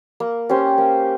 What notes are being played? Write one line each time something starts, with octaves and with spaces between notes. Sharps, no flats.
A#3
C#4 G4 C5
A#3